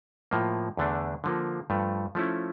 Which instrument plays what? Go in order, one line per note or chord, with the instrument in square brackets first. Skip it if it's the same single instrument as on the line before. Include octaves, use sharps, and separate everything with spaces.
[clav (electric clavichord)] A2 F3 A#3
E2 D3 A3 D4
D3 F3 A#3
G2 F3 A3
F3 A3 C#4 E4